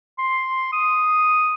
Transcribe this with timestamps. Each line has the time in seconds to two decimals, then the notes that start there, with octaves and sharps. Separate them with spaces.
0.19 C6
0.72 D#6